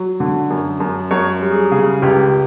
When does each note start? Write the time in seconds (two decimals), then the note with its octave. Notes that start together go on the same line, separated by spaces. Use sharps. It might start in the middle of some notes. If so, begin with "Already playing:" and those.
Already playing: F#3
0.20 D3
0.50 F#2
0.80 F#2
1.11 F#2 C#5
1.41 G3
1.51 G#4
1.71 C#3 G#4
2.02 C#2 G4